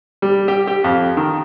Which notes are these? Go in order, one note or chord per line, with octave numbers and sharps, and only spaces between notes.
G3
G4
G4
F2
D#3